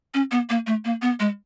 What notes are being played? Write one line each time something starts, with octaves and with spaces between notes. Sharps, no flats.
C#4
B3
A#3
A3
A#3
B3
G#3